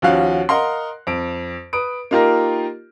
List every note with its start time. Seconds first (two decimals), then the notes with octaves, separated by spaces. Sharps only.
0.02 D#2 F3 C#4 F#4 F5 F#6
0.49 A#4 D#5 F5 F#5 C6
1.07 F2 D7
1.73 B4 D#6 D7
2.11 A#3 D#4 F4 G4 A#4